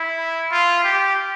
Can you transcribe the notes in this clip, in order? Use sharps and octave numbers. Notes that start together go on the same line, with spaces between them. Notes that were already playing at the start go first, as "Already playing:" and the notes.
Already playing: E4
F4
G4